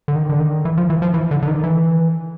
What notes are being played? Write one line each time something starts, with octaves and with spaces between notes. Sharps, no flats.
D3
D#3
D3
D#3
E3
F3
E3
F3
E3
D3
D3
D#3
E3